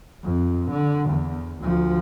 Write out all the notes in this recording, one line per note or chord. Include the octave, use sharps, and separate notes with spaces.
F2
D3
E2
D2 F3